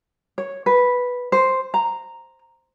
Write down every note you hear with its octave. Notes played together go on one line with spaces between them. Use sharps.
C#5
B4
C5
A#5